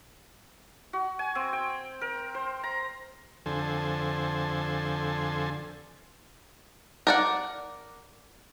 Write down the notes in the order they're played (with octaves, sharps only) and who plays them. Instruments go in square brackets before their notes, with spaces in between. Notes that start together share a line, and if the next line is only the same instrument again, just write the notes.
[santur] F#4
G#5
C4
G5
A#4
C5
A#5
[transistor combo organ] F2 D3 A4 C5 G#5
[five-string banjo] A#4 D5 F#5